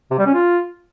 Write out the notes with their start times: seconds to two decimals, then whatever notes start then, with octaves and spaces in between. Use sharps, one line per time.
0.11 C3
0.19 G3
0.26 C#4
0.34 F4